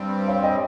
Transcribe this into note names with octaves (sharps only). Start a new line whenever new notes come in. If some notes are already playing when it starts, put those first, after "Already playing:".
Already playing: G2 G3 C4
C#5 F5
D#5 G5